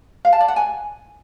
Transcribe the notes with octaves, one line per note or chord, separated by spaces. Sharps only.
F5
A5
D5
F#5
G#5